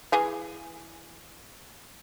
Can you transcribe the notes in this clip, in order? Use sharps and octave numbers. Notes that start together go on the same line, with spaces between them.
E3 G#4 F5